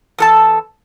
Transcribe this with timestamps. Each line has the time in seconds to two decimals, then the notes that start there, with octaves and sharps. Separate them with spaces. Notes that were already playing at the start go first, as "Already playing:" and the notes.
0.18 E2 A4 A5